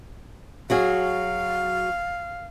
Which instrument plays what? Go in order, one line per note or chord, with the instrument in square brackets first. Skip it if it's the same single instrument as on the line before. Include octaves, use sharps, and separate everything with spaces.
[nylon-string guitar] F#3 F#4 G#4 [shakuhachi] F5